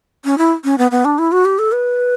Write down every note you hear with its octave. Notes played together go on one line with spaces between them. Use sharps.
C#4
E4
C#4
B3
B3
D4
E4
F#4
G4
A4
B4